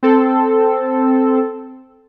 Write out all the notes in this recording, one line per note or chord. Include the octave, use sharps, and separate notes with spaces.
C4 A4